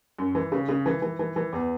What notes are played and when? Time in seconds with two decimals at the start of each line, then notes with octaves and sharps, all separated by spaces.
0.19 F#2
0.35 E3
0.52 C#3
0.69 C#3
0.86 E3
1.02 E3
1.19 E3
1.36 E3
1.53 E2